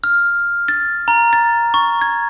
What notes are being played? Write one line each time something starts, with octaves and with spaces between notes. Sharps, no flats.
F6
A6
A#5
A6
C#6
G#6